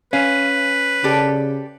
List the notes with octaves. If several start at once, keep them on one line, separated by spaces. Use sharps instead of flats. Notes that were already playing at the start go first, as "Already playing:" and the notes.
C#4 B4 F5
C#3 G4 A4 D5